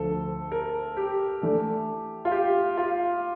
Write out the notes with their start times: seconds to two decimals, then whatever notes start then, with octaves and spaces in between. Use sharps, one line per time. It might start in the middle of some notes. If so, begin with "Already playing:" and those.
Already playing: D2 D3 F3 A4
0.52 A#4
0.97 G4
1.42 E3 A3 D4 A4
2.25 F4
2.32 G4
2.77 F4